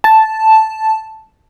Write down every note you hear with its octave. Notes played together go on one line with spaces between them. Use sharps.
A5